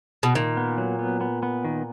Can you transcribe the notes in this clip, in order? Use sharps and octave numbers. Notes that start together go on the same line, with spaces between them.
B2
A#2 D#3
B3
F#3
B3
B3
B3
D#3